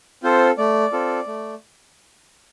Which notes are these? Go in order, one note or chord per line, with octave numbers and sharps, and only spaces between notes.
C4 F4 A4 C5
A3 D5
C4 F4 A4
A3